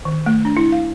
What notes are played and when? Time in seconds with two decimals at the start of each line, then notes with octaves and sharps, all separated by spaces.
0.05 D#3
0.26 A3
0.45 D4
0.57 E4
0.72 F5